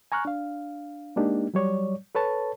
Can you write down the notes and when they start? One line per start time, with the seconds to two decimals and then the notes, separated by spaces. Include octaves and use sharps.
0.12 G#5 A#5 C#6 F6 F#6
0.25 D4 F5
1.16 G#3 A#3 D4 D#4 G4
1.54 F#3 G3 C#5 D5
2.15 A4 B4 C#5 A5